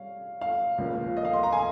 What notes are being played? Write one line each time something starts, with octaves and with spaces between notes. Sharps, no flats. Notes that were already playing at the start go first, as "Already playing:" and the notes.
Already playing: G3 C#4 F5
F5
C#2 C#3 F3 A#3 C#4
D#5
F5
C6
A#5
G#5